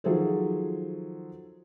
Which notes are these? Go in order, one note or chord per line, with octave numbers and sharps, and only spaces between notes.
D#3 F3 F#3 G#4 A4 C5